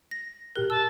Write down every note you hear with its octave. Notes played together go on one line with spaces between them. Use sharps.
A#6
A#2 G4 A#4 F#6
A5 E6